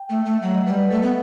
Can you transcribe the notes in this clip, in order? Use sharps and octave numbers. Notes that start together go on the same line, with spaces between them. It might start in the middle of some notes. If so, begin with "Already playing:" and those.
Already playing: G5
A3
A3
F#3 F#5
D#5
G3 B4
B4
A3 A4
B3